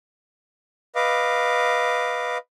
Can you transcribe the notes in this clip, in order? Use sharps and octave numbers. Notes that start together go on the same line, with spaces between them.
B4 D#5 F5 D6